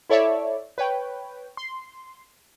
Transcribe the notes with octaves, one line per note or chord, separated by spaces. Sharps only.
E4 A4 C#5 D5 E5
B4 C#5 G5
C6